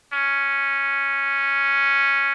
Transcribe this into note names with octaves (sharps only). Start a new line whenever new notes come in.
C#4